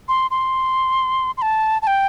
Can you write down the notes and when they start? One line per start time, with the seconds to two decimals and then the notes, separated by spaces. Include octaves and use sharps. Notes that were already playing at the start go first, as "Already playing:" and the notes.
0.08 C6
0.31 C6
1.37 C6
1.42 A5
1.82 A5
1.87 G5